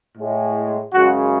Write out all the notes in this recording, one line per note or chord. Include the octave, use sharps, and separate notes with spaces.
A2 G#3
F#2 C#3 G#3 F#4